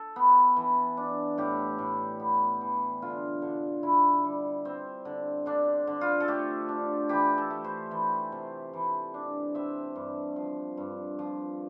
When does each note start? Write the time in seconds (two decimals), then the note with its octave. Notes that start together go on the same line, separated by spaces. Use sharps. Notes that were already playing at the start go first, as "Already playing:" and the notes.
Already playing: A4
0.16 B3
0.56 E3
0.97 D4
1.38 A2 G4
1.79 A2
2.20 B3
2.61 E3
3.02 D3 F4
3.42 D3
3.83 D3 E4
4.24 G3
4.65 C4
5.05 D3
5.46 D3 D4
5.87 D3
6.01 F4
6.20 A4
6.28 A3 G4
6.69 D4
7.09 E3 G4
7.38 A4
7.50 A3
7.64 C5
7.91 E3
8.32 C3
8.73 E3
9.14 D4
9.55 C4 E5
9.96 G2
10.36 F3
10.77 G2
11.19 F3